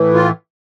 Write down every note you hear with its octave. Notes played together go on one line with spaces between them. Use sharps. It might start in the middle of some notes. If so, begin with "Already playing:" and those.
Already playing: A2 E3
F4